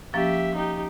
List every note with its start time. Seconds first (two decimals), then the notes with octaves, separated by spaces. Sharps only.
0.14 F3 A#3 C#4 G4 E5
0.55 D#4 G4